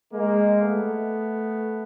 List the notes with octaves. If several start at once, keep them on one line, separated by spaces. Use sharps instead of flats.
G#3 A#3
A3 B3